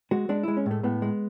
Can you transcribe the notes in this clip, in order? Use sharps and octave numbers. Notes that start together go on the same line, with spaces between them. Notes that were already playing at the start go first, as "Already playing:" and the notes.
G#3 F#4
G#3 D4
G#3 E4
C#4
A2 A3
A2 B3
G#3